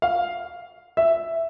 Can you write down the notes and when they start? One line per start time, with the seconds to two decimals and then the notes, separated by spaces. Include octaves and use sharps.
0.02 F5
0.97 E5